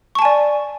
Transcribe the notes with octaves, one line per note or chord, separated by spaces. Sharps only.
D5 G#5 A5 C#6